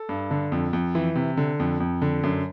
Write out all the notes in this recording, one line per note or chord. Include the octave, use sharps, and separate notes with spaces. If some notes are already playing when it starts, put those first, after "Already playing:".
Already playing: A4
G2
D3
F2
F2
E3
C3
D3
F2
F2
D3
F#2